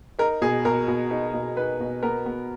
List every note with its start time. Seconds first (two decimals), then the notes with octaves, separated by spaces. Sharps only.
0.19 D#4 A#4
0.42 B2 G#4
0.65 B2 A#4
0.88 B2
1.11 D#4
1.34 B2
1.57 D#4 B4
1.80 B2
2.03 B3 A#4
2.26 B3